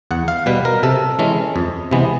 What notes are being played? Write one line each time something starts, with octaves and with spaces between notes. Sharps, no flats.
E2 F#5
F5
B2 G3 B4
A#4
C3 A4
E3 G#3 C#4
F2
C3 E3 G#3 B3